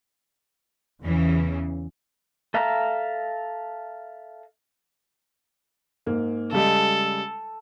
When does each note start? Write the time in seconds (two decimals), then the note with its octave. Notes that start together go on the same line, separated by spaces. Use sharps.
1.01 E2 C#3 E3
2.54 A4 E5 F5 A#5
6.06 G#2 A#3
6.52 C#3 G3 G#3 A4